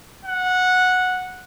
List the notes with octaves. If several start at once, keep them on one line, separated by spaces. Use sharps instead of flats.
F#5